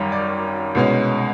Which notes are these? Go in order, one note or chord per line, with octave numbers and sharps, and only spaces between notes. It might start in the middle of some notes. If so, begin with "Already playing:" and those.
Already playing: G#1 F#2 D#3 G3 C#5
D5
C2 B2 G#3 C#4